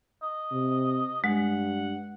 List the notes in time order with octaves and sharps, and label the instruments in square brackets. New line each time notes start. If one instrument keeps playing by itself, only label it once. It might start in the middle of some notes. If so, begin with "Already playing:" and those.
[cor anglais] D#5
[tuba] C3
[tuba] G2 [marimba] G#3 [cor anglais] F#5